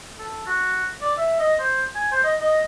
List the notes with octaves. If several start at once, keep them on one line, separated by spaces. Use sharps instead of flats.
A4
F#4
D5
E5
D#5
C5
G#5
C5
D#5
D#5